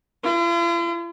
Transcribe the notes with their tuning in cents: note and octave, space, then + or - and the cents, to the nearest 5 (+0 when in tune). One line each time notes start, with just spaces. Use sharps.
F4 -45